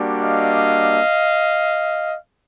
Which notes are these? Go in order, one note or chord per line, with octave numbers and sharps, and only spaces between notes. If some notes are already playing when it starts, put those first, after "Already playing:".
Already playing: G3 A#3 D4 F#4
D#5 F5